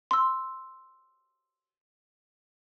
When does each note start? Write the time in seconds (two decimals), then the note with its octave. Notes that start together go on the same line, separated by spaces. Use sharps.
0.11 C6 E6